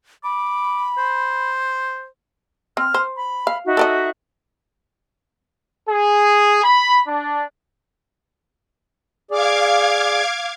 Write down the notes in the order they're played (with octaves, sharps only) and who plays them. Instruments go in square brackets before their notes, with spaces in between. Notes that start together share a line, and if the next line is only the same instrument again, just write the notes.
[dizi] B5 [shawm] D6
[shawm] C5
[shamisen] C4 [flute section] F6
[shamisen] C5
[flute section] B5
[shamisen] F5
[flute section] D#4 F#4 E5
[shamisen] A4 D5 D#5
[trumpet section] G#4
B5
D4
[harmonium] G#4 D5 [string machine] F5 D6 G#6